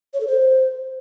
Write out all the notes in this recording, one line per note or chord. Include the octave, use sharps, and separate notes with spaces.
C#5
A4
C5